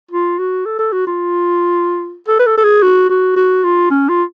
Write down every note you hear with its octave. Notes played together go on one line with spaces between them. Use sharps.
F4
F#4
A4
A4
F#4
F4
A4
B4
A4
A4
G#4
F#4
F#4
F#4
F4
C#4
F4